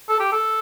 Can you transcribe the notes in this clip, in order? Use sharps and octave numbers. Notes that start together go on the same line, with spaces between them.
A4
G4
A4